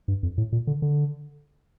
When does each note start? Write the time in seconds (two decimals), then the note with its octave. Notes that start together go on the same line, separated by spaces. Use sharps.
0.08 G2
0.23 F2
0.38 A2
0.52 A#2
0.67 D3
0.82 D3